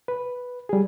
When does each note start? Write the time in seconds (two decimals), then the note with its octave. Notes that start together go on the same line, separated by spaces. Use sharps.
0.08 B4
0.69 G3 G#4